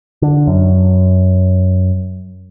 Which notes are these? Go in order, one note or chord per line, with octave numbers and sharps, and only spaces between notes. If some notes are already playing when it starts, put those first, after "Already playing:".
D3
F#2